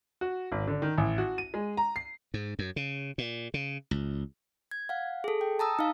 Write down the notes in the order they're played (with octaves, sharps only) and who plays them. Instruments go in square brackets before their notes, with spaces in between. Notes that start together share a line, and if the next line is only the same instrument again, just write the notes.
[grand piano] F#4
G#1
D3
D#3
A1
F#4
D#7
G#3
A#5
C7
[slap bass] G#2
F#2
C#3
A#2
C#3
C#2
[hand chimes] G#6
F5 F#5
G#4 A4
G5
A5 A#5 D#6 E6
D#4 F5